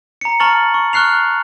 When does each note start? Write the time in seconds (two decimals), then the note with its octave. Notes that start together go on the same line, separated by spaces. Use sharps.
0.21 A#5 C#7
0.40 A5 A#5 C#6 F6 A6 F#7
0.74 C#6
0.93 C#6 F6 F#6 C7 F7